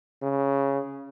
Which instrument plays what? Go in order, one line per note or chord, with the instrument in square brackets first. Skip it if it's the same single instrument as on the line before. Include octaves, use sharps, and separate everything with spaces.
[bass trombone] C#3